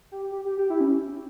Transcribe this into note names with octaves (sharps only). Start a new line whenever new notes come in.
G4
G4
G4
G4
E4
C#4